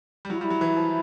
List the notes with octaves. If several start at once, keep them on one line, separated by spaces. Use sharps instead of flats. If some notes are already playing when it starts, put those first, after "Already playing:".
G3
F#3 E4
F4
G3 E4
F#3
E3
F3